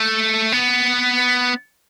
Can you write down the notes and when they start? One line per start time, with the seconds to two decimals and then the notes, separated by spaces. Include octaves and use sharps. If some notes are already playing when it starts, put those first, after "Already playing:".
Already playing: A3
0.52 B3